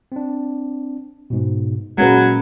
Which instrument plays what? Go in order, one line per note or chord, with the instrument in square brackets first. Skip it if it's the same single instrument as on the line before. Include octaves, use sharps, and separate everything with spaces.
[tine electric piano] C4 D4
G#2 B2
[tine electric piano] A#2 A#3 [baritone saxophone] F#3 [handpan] G#3 C#4 B4